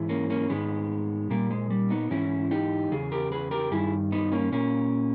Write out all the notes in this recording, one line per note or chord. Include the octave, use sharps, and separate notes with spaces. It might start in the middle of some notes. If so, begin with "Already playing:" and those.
Already playing: G#2 E3
A#3 C#4
A#3 C#4
G#2 D#3 G#3 B3
A#2 G3 A#3
G#3
G3
B3 D#4
G#2 E3 C#4 E4
D#4 G4
E2 C#3 G#4
G4 A#4
G#4 B4
G4 A#4
G2 D#3 E4 G#4
B3 D#4
A#3 C#4
A#2 A#3 C#4